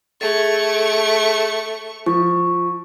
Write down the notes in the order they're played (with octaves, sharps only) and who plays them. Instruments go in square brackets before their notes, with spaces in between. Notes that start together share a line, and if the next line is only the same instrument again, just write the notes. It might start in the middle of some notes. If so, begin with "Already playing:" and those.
[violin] A3 C#6 [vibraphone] G#4 A4
[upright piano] F3 [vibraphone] C#6